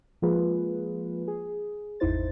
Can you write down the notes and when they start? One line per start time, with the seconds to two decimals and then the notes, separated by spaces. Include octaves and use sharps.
0.22 F3 G#3 A#3 F4 G#4 B4
1.28 G#4
2.00 G#1 E2 D#4 E4 C5 A6